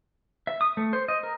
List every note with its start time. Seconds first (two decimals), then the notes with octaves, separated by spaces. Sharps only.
0.47 E5
0.61 D#6
0.77 A3
0.93 C5
1.08 D#5
1.23 A#4